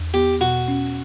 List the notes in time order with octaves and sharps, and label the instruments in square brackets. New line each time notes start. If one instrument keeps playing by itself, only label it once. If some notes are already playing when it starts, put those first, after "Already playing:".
Already playing: [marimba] E2
[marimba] B3 [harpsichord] G4
[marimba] B2 [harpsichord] F#4
[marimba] C#4